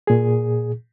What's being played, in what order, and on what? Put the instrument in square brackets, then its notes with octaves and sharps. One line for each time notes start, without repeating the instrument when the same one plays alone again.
[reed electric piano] A#2 G#4